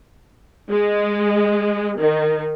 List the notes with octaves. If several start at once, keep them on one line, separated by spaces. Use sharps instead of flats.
G#3
D#3